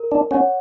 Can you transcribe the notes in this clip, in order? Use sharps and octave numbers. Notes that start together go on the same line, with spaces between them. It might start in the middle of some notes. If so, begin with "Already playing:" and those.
Already playing: A#4
D4
C#4 C#5 F#5